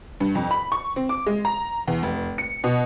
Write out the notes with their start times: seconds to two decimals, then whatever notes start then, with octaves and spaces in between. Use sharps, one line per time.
0.20 G2
0.35 F2
0.51 B5
0.72 C#6
0.96 C4
1.09 D6
1.26 G#3
1.45 A#5
1.88 E2
2.03 F1
2.38 C#7
2.64 B2